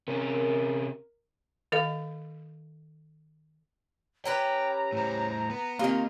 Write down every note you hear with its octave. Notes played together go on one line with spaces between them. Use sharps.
C3 C#4 A#4
D#3 A4 D#5 F5
C#4 G4 B4 G5 A#5
A2 C5
B3
D#3 A#3 C4 F4 G4 F5